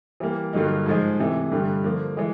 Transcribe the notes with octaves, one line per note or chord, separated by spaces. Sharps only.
E3 G3 A#3
G2 D3 F#3 A#3 D#4
G#2 F3 G#3
C3 E3 A3
G2 D3 G3
D3 F3 A#3
E3 G#3